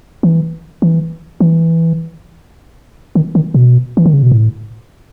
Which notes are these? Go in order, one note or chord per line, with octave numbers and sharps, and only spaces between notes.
E3
E3
E3
D#3
D#3
B2
E3
D#3
C#3
B2
A2